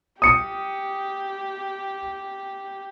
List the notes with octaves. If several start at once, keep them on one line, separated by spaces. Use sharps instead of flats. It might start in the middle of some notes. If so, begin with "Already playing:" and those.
G4 D#6 C#7